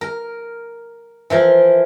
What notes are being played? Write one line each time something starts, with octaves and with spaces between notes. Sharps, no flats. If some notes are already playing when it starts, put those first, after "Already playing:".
A#4
E3 F3 A#4